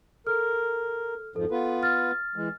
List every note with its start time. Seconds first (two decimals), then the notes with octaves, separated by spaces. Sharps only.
0.27 A4 A#4 F6
1.36 F2 G#2 F3 A4
1.51 B3 F4 B4
1.83 F6 A6
2.36 E3 G#3